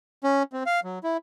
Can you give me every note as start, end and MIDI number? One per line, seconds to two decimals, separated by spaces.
0.24 0.43 61
0.53 0.63 60
0.66 0.80 77
0.84 0.99 54
1.04 1.17 64